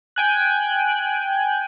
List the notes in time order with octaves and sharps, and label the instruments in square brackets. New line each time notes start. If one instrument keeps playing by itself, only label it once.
[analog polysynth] G5 G#5 F#6